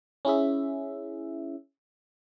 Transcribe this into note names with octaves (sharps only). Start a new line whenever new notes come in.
C#4 E4 G#4 E5